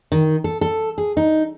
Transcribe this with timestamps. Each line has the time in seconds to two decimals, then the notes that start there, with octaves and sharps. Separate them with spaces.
0.12 D#3
0.44 A4
0.61 A4
0.98 G#4
1.17 D#4